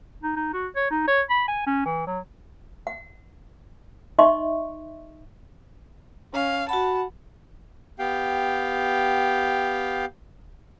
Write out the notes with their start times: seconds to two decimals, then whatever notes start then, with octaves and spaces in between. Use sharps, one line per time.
0.23 D#4
0.36 D#4
0.53 F#4
0.76 C#5
0.91 D#4
1.07 C#5
1.30 B5
1.48 G#5
1.67 C#4
1.85 E3
2.07 F#3
2.87 F#5
4.19 D#4 D#5 E5 C6 C#6
6.34 C#4 F5
6.69 F#4 F#5 A5 B5
7.99 B3 G4 F5 G5